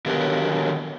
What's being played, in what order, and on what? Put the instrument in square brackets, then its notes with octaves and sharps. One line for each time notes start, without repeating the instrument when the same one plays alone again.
[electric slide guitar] D3 D#3 F#3 B3 G4 A#4